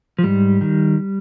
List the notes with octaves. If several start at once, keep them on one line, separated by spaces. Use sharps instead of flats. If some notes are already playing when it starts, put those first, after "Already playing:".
F3
G#2 G3
D#3